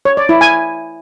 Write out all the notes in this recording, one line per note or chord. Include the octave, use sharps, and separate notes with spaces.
C#5
D5
E4
G#5